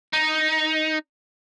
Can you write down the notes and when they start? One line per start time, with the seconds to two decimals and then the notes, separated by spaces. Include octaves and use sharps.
0.13 D#4